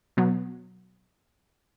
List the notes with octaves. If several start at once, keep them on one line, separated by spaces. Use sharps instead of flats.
B2 F#3 B3